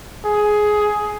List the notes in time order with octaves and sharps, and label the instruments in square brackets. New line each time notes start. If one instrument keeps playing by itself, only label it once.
[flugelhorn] G#4